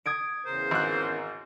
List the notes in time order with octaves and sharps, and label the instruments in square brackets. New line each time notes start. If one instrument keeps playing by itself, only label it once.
[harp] D#6 G#6 D7
[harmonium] E2 C#3 A#4 [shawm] C5
[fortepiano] G#1 F#6